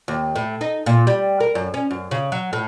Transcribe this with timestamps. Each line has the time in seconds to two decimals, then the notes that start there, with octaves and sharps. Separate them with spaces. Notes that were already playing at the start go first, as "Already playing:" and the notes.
0.08 D#2
0.36 A2
0.61 D#4
0.86 A#2
1.07 G3
1.40 A#4
1.55 F#2
1.74 C#4
1.91 F#2
2.11 C#3
2.32 F#3
2.53 A2